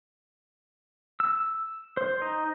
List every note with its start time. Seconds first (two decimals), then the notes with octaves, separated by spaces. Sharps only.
1.20 E6
1.97 C5
2.22 D#4